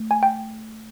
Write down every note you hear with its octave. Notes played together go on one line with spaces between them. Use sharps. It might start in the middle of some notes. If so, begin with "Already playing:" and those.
Already playing: A3
G#5
G5